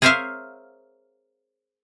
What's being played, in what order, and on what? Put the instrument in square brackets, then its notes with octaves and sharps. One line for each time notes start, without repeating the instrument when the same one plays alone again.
[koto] G#4 A#4 C5 C#5 E5 F5